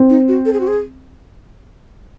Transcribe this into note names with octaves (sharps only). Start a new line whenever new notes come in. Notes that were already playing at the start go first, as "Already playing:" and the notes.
Already playing: C4
D#4
F#4
A4
G#4
F#4
G#4